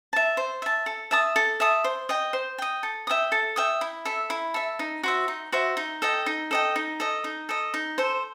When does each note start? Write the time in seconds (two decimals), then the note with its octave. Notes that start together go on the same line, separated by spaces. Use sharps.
0.13 E5 A5
0.37 C5
0.62 E5 A5
0.86 A4
1.11 E5 A5 D#6
1.36 A4
1.60 E5 A5 D#6
1.84 C5
2.09 D#5 G5
2.33 C5
2.58 D#5 G5
2.83 A4
3.07 E5 G5 D#6
3.32 A4
3.56 E5 G5 D#6
3.81 E4
4.05 A4 E5
4.30 E4
4.54 A4 E5
4.79 D#4
5.03 F#4 C5 E5
5.28 D#4
5.52 F#4 C5 E5
5.77 D#4
6.02 A4 D#5 G5
6.26 D#4
6.51 A4 D#5 G5
6.76 D#4
7.00 A4 D#5
7.24 D#4
7.49 A4 D#5
7.74 D#4
7.98 A4 C5